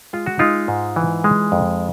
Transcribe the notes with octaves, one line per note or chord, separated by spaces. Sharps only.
G#3 F4
F#4
G#3 D#4 F4
G#2
E3
G#3
F2